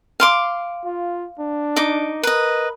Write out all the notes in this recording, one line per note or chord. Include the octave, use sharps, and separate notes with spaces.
F5 C6 D6
F4
D4
D#4 D6
A#4 B4 D#5